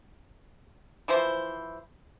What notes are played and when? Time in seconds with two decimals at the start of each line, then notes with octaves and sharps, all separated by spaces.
1.08 E3 F3 E4 C5